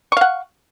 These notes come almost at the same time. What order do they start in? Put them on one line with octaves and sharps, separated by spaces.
C#6 F5 F#5